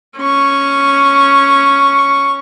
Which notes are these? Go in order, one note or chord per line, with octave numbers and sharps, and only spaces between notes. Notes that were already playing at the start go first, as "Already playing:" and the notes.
C#4 C#6